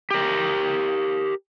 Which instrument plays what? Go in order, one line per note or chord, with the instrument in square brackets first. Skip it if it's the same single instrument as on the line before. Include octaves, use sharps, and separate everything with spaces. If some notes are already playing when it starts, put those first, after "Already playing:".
[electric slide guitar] G4 A#4